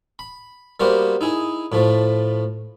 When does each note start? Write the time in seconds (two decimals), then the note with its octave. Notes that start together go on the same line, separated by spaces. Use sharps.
0.19 B5
0.80 G3 A#3 B3 F#4 A#4 C5
1.21 D#4 E4 G#4
1.72 A2 F3 A3